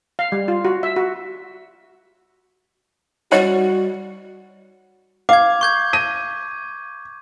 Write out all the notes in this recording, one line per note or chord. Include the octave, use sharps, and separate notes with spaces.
F5
G3
F4
F#4
E5
F#4
G3 F#4 C#5 D#5 F#5
F5 D6 G#6
C#6 G6 G#6
D#7